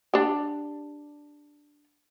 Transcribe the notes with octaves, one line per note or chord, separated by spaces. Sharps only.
D4 G4